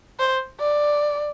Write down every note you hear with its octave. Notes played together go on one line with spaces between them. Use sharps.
C5
D5